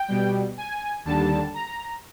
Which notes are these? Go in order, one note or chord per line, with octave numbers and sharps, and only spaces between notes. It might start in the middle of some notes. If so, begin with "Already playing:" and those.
Already playing: G5
B2 G3
G#5
D#2 D3 G3 A5
A#5